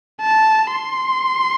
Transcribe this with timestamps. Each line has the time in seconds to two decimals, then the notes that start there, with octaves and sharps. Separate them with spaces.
0.21 A5
0.72 C6